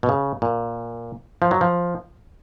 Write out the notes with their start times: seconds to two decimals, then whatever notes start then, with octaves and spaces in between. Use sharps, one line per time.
0.03 B2
0.09 C#3
0.42 A#2
1.42 F3
1.51 F#3
1.61 F3